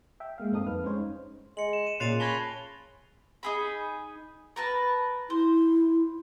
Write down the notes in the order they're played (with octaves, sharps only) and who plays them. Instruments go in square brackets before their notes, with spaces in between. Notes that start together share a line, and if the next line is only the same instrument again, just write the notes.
[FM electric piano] E5 G5
G#3 A#3 F5
G2 C4 D#4 A4 D#6
F2 B4 F5 F6
G#3 C#4 D#4 C5 C#5
[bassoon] G#3 [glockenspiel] C#7 F#7
[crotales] E7
[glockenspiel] D#7
[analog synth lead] A#2 [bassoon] C#3 [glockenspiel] C6 A6 D#7 [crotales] F#6 C7 F7
[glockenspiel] G#5 A5 C#6 [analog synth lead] B5 [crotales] G#6 A#6 G7
[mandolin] D#4 G#4 B5
A#4 B4 A5
[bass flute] E4 [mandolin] C5